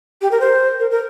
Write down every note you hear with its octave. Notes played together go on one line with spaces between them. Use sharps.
G4
A#4
C5
A#4
A#4